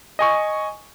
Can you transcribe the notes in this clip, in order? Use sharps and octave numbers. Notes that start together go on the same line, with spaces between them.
D#5 G#5 C#6